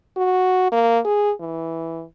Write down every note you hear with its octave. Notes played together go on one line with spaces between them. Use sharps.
F#4
A#3
G#4
E3